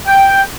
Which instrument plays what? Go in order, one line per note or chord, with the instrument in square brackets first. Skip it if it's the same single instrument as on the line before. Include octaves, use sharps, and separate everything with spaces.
[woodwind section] G5